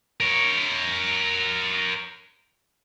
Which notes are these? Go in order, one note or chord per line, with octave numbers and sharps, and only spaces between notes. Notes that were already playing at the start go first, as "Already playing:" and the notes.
A#4 C#5